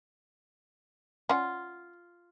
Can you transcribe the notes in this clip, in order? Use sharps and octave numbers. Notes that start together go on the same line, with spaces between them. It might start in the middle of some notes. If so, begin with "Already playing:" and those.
C#4 F4 D5 F#5